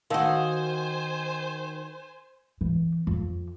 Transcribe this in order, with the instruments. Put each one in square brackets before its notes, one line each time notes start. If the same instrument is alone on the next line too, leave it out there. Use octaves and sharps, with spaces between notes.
[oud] D#3 F#4 [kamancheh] C5 G#5 [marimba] F5 A5 E6
[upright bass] E3
F2